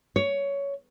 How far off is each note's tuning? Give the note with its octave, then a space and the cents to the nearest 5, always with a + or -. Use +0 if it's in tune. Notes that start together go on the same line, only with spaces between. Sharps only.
C#5 +15